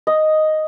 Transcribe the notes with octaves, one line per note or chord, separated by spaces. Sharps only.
D#5